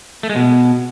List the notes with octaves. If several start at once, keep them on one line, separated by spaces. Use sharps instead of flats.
A3
G#3
B2